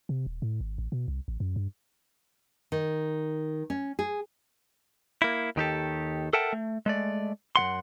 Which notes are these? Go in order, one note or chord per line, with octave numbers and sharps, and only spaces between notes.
C3
D#1
A2
G#1
A1
B2
C2
A1
F#2
G2
D#3
C#4
G#4
A#3 E4
D#2 D#3 G4 A4
A4 A#4 E5 F#5 G5 A5
A3
G#3 A3 D5
F#2 E3 F#5 C6